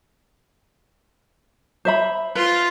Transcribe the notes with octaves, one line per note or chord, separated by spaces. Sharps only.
C5 E5 B5
F4 B4 C6